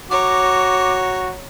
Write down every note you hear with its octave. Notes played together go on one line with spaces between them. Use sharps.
F#4 C#5 A#5 D6